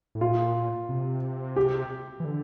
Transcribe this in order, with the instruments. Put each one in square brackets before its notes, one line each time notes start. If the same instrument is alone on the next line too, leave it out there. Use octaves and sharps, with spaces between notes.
[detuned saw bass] A2
[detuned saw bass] A#2 [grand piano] F4
[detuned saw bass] C3
[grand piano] G4
[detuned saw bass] E3
D3